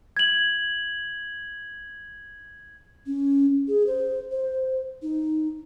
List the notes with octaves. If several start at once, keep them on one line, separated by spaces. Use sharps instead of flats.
G#6 F#7
C#4
G#4
C5
C5
D#4